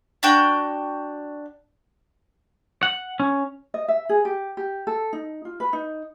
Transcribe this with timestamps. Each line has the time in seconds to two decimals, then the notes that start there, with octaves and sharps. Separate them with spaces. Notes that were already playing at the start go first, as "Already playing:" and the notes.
0.23 D4 F#4 G5
2.83 F#5
3.20 C#4
3.74 D#5
3.88 E5
4.09 G#4
4.25 G4
4.57 G4
4.87 A4
5.13 D#4
5.45 F4
5.60 B4
5.73 D#4